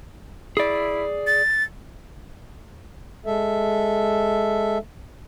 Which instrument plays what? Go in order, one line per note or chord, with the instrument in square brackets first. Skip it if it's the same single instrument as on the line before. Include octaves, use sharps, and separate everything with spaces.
[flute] E4 [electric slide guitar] G#4 D5
[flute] A6
[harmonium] G#3 A4 E5